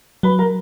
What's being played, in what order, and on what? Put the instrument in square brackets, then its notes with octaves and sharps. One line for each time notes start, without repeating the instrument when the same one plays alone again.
[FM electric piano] F#3 [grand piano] B4 B5
[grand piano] A#4 A#5